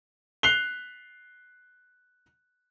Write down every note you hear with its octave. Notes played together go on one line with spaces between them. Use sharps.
F#6 C7 F7 G7